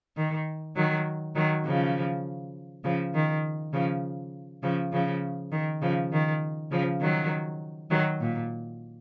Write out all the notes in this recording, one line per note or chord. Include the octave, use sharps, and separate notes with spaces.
D#3
D#3 F#3
D#3 F#3
C#3 F3
C#3 F3
D#3
C#3 F3
C#3 F3
C#3 F3
D#3
C#3 F3
D#3
C#3 F3
D#3 F#3
D#3 F#3
A#2